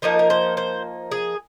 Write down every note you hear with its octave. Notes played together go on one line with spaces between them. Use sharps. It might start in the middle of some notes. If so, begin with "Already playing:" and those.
F3 A#3 D#4 A#4
A#4
C5
C5
G#4